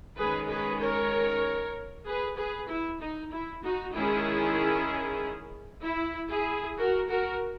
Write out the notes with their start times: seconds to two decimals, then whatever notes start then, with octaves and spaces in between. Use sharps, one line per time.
0.17 D#3 G#3 C#4 G#4 B4
0.49 G#4 B4
0.80 A#4 C#5
2.06 G#4 B4
2.37 G#4 B4
2.69 E4
3.01 D#4
3.32 E4
3.63 D#4 F#4
3.95 D#3 G#3 C#4 E4 G#4
5.83 E4
6.30 E4 G#4
6.78 F#4 A#4
7.09 F#4 A#4